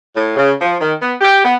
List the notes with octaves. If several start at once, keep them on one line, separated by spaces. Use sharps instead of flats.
A2
C#3
F3
D#3
B3
G4
B3